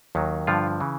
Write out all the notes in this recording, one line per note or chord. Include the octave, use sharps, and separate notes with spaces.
D#2 D#3 F#3
G2 D3 F3 F4
C#3 E3